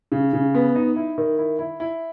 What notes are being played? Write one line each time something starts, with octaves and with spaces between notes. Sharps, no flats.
C#3
C#3
B3
D#4
E4
D#3
E4
E4
E4